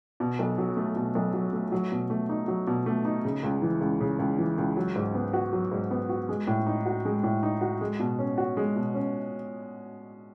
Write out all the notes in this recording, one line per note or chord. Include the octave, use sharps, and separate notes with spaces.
B2
B1
F#3
A3
B2
B1
F#3
A3
F#3
B2
A3
D#4
F#3
B2
A3
D#4
C#3
C#2
E3
C#2
C#3
C#2
E3
C#2
F#3
G#2
B3
F#4
F#3
G#2
B3
F#4
G#3
A2
D#4
F#4
G#3
A2
D#4
F#4
G#3
B2
C#4
F#4
G#3
B2
C#4